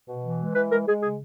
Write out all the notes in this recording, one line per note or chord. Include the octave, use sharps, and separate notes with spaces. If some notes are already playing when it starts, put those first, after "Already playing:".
B2
E3
G#3
E3 B4
G#3 A#4
G#3 G#4
C#3 G#4